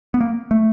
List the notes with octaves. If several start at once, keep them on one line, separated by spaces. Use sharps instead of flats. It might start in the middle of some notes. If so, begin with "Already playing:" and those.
B3
A#3
A3